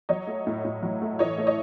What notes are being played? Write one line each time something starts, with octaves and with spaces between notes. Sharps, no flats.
F#3 C#5 D#5
A3
A2
A2
F#3
A3
E3 C#5 D#5
A3
C#5 D#5